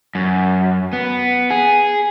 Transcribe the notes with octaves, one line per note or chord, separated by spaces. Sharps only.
F#2
B3
G#4